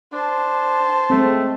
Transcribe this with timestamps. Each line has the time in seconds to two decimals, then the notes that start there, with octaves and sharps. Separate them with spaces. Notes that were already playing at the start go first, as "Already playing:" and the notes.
0.12 D4 C5 A5
1.10 G#3 A3 C4